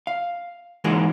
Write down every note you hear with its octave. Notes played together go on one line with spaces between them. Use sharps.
F5
G#2 E3 G#3 A#3 F#4